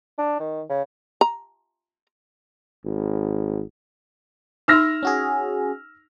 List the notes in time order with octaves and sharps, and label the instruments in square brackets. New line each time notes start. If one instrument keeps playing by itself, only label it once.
[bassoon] D4
D#3
C#3
[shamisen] A#5
[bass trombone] G#1
[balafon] D#4 E5 C6 [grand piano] E6 F6 A#6
[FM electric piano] C#4 F#4 G#4